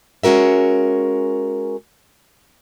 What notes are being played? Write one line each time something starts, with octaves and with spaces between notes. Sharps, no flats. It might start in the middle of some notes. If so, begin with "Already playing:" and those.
G#3 C#4 F#4 A#4 E5